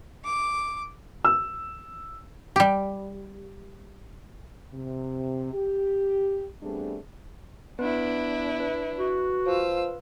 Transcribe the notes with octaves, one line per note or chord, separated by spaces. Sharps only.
D6
E6
G3 G4
C3
G4
G3 A3 B3 C4 D4 G#4
B3 D4 E4 B4
B4
F#4
F3 F4 E6